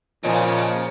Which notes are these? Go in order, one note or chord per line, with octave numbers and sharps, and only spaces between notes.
A#2 C#3 F3 C#4 C#5 D#5